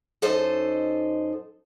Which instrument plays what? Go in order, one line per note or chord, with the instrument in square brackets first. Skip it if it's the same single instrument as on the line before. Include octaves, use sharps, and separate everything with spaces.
[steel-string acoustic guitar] F#2 D#4 A4 C5 D#5